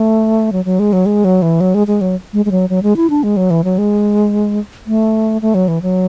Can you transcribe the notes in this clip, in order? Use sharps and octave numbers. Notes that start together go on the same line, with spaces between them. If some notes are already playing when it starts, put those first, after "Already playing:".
Already playing: A3
F#3
F#3
G#3
F#3
G#3
F#3
E3
F#3
G#3
G#3
F#3
G#3
G#3
F#3
F#3
G#3
E4
D4
G#3
F#3
E3
F#3
G#3
A3
A3
F#3
E3
F#3